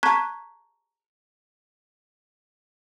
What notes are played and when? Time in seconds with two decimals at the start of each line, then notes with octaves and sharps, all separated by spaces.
0.03 A5 A#5 C#6 F#6 G#6 B6